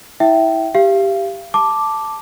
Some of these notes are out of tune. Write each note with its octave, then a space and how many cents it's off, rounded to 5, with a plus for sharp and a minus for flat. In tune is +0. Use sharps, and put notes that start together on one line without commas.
E4 -25 E5 +0 G5 -20
G4 +0 F5 -35
A5 +0 D6 +0